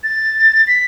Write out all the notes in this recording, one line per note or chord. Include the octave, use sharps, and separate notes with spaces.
A6
B6